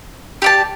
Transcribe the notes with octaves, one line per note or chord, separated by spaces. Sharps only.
G4 D5 A5